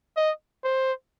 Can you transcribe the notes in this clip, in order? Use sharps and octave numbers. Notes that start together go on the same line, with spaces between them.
D#5
C5